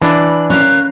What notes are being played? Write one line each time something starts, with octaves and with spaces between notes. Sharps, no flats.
E3 D4 B5
C#4 A#4 F5 F#6